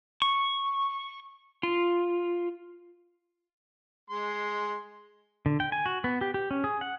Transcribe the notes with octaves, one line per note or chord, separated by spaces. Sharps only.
C#6
F4
G#3 C6
D3
G5
G#5
F#4
B3
G4
G4
C#4
G#4
F#5